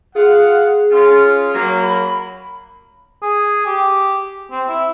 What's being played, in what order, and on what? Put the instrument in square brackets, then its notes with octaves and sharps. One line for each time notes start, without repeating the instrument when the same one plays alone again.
[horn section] F4 F#5 [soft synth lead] G#4
[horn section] C#4 F4
F#3 A#3
[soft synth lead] B5
[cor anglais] G#4
G4
C4
E4